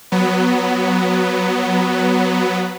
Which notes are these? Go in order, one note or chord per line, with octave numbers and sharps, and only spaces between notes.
F#3 B3